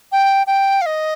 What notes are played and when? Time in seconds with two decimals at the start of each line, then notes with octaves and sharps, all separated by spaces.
0.12 G5
0.47 G5
0.82 F5
0.86 D#5